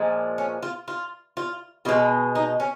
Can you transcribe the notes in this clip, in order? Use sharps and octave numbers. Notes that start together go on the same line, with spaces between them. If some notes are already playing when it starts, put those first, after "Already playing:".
Already playing: A#2 F3 G#3
C#4
F4
F4
F4
B2 G#3 F4
D#4
C#4